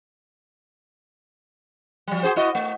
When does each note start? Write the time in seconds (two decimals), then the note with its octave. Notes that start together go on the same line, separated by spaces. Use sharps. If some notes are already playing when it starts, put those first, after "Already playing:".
2.08 F3 G3
2.23 F#4 G#4 C5
2.36 E4 F#4 D#5
2.55 A3